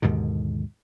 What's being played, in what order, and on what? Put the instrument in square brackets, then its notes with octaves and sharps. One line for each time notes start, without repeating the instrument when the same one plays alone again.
[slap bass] D#2 G#2 B2 D3